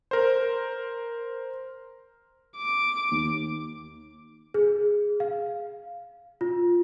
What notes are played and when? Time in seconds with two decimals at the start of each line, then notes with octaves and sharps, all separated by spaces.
0.11 A#4 C5
2.57 D6
3.11 D#2
4.54 G#4
5.20 F5
6.41 F4